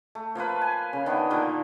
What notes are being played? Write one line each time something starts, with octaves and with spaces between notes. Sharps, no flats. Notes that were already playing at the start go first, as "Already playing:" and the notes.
A3
F3 A#3 F4 B4
G#5
C#3
D#3 B3 D4
A#2 D3 D#3 A#3